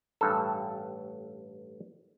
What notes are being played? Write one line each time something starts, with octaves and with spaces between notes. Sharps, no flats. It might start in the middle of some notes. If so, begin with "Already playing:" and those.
A1 G2 A4